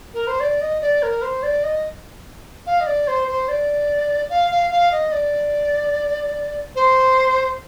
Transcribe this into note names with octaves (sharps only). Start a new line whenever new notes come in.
A#4
C5
D5
D#5
D5
A#4
C5
D5
D#5
F5
D#5
D5
C5
C5
D5
F5
F5
F5
D#5
D5
C5